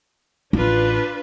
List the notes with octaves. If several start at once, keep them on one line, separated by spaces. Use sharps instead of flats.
A1 D4 F4 B4